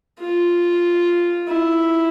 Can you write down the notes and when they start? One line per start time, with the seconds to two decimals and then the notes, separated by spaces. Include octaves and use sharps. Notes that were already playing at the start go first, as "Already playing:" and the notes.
0.19 F4
1.48 E4